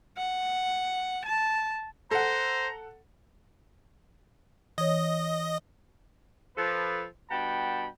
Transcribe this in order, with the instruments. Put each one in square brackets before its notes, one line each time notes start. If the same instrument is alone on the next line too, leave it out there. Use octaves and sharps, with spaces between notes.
[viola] F#5
A5
[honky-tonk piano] A4 F#5 [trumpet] C5 [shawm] A#5
[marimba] E3 C#5 [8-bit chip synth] D#5
[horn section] F3 A4 B4
G2 B2 F#5 G5 A5 B5